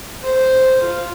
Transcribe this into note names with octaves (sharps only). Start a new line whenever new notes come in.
C5
F4